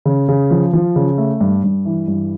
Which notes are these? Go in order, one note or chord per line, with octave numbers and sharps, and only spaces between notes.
C#3
C#3
F3
F3
C#3
A3
G2
G2
E3
G2